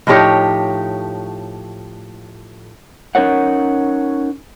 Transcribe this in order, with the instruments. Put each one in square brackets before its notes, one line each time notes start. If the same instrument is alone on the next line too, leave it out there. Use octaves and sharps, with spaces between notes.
[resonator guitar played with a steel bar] A2 F3 D#4 G4 C#5
[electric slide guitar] C#4 D#4 A#4 C#5 F#5